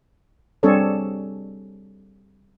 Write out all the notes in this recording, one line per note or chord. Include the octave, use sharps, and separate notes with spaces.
G3 C4 D4 G#4 A4 C#5